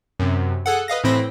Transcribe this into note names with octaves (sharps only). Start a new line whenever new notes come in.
F#2 C3
G#4 A4 F#5
B4 D#5 F5 A#6
A2 E3 C4 B5 A#6